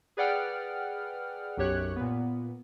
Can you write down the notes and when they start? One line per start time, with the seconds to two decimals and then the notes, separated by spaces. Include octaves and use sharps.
0.17 G#4 B4 D5 F#5 G5 F6
1.57 B1 F#2 G4 C#5 F#6
1.96 A#2 B3